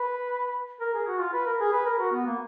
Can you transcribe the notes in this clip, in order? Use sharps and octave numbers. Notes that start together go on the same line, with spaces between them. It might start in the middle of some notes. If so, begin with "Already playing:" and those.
Already playing: B4
A#4
G#4
F#4
F4
B4
A#4
G#4
B4
A#4
F#4
B3
A#3